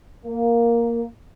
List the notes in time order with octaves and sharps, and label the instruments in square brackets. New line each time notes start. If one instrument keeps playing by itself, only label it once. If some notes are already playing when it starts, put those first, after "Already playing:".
[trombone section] A#3